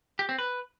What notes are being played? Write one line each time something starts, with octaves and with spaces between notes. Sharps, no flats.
G4
C4
B4